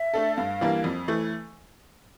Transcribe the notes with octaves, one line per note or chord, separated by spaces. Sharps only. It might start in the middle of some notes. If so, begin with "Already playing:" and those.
Already playing: E5
A3 D4 A4
G2 F5
E3 G3 A#3 D4
F2
E3 A3